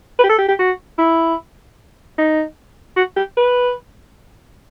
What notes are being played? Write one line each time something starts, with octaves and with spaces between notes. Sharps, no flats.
B4
G4
A4
G4
G4
F#4
E4
D#4
F#4
G4
B4